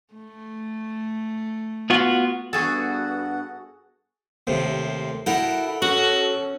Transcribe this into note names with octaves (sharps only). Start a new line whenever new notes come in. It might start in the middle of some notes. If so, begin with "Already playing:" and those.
A3
B3 F4 F#4
G2 B3 F#4 G#4 A4 F#5
D#2 A2 C3 C5
D#4 E4 F#4 A4 A#4 G5
C#4 F#4